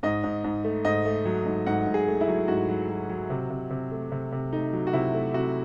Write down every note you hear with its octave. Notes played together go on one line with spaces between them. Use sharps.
G#2 D#5
G#2
G#2
A3
G#2 D#5
A3
F#3
G#2
G#2 F#5
G#2
G#4
A3
E4
F#3
G#2 F#4
F#3
F#3
F#3
C3
C3
C3
A3
C3
C3
A3 D#4
F#3
F#4
C3 E4
A3
C3 F#4